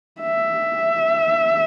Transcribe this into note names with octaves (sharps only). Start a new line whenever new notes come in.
E5